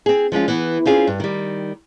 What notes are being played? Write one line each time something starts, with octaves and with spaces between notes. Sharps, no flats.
C4 G#4
F3 G#3 C#4 F4
E3 B3
C4 C#4 F4 G#4
G2
D#3 G3